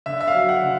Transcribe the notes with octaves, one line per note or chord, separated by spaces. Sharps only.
D3 E5
E5
F5
F#3
F#5
D3